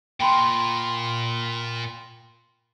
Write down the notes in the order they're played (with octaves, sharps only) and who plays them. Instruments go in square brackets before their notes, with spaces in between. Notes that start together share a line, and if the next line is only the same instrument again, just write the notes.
[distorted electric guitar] A#2 [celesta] G5 B5 C6